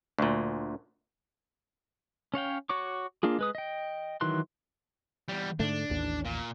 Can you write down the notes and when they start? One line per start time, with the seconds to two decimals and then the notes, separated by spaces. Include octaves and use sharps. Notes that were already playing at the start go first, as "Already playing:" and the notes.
0.19 D2 A#2
2.34 C#4 C#5 F5 G5
2.69 F#4 C#5 C#6 D6
3.23 A#3 D4 F4 G#4
3.39 G#3 B4 D#6
3.55 D#5 G5
4.21 D#3 E3 F#3 C6 F#6
5.29 E2 G3
5.59 G#2 D3 A3 D4
5.90 A1 D#2
6.25 A#2